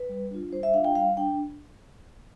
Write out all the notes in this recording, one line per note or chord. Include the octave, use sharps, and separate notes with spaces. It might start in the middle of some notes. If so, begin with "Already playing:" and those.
Already playing: B4
G3
D4 F4
G3 C5
E5
D4 F4 F5
G5
G3 F5
D4 G5